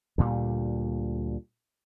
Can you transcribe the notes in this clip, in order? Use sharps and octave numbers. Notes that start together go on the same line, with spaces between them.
D2 A#2 G3